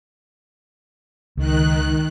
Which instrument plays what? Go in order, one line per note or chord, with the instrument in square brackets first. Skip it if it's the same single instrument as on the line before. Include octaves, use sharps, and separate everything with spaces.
[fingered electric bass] C#2 [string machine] D#3 F#6